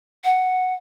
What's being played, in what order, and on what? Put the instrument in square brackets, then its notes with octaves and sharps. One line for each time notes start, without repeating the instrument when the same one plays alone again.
[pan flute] F#5